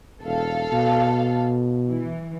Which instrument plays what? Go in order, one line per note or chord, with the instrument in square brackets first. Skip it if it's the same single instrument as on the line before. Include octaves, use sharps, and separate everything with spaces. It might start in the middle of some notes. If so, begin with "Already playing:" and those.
[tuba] E1 [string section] A4 F5
[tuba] B2
[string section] E3